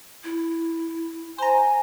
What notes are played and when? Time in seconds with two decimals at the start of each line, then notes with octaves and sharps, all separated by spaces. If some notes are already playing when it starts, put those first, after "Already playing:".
0.24 E4
1.38 C5 G#5 A#5